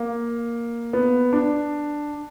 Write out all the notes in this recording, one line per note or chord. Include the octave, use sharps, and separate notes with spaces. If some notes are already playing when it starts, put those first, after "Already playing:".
Already playing: A#3
B3
D4